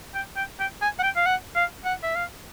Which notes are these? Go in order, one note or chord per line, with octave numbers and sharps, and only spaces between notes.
G5
G5
G5
G#5
F#5
G5
F5
F#5
F5
F#5
E5
F5